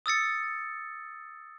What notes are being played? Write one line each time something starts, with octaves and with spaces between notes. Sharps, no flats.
D#6 E6 A6 C#7